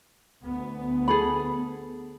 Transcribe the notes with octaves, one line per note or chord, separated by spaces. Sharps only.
D2 B3
G#4 A4 B5